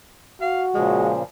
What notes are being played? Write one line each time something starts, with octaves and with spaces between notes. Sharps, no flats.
F#4 F5
A#2 C#3 F3 G#3